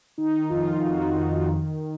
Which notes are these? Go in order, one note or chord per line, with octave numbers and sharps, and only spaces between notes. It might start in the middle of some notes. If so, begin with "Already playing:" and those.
D#3 D#4
F2 F4
F2 F#4
D#3
D#3